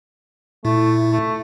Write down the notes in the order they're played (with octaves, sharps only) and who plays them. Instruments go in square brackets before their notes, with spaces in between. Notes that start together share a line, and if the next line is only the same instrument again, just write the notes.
[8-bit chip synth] A#2 E4 [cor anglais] A3
[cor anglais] A3